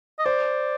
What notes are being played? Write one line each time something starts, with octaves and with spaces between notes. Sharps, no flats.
D#5
C5 D5